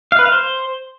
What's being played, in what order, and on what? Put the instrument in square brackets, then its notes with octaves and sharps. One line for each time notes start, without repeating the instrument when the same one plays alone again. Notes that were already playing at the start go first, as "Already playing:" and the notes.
[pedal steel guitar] F5
B4
F5
C5